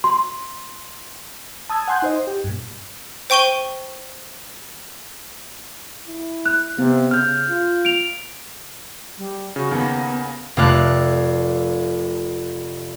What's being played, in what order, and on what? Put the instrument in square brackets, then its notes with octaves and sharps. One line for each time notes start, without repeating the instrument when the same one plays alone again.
[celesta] C6
[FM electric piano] A5 D#6 E6 G#6
F#5 G#5 C6 F#6 G6
D#4 C5 D#5
G4
G2 A#2
[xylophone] C5 G5 C#6 D#7 G7
[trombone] E4
[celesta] F#6
[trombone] C3 [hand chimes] B3
[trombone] C#3 [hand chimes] F6 G6
[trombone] F4
[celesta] D7 F7
[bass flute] G3
[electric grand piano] C#3 [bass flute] F#4
[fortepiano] D#2 D#3 A#3 [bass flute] B3
[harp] F1 A3 F4 D5 F#6